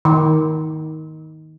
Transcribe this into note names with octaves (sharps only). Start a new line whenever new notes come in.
D#3